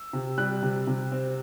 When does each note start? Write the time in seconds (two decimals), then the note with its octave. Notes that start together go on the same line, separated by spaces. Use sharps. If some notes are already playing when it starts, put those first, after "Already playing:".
Already playing: E6
0.13 C3
0.38 G3 F#6
0.62 C3
0.87 C3
1.12 C4